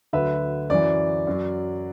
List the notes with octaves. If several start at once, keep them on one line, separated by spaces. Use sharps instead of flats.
D2 D3 F#3 B4 E5
F#2 E3 D5
F#2 F#3